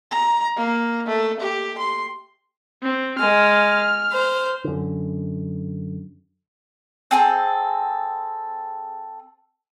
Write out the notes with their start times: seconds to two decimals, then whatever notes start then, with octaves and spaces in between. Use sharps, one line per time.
0.11 A#5
0.56 A#3
1.07 A3
1.40 G4
1.78 C6
2.83 C4
3.20 G#3 F6
4.12 C5
4.64 F#2 D3
7.11 C4 G#4 A4